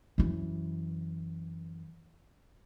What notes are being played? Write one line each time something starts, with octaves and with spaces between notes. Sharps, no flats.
F#2 E3